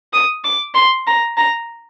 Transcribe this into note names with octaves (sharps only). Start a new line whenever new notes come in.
D#6
D6
C6
A#5
A#5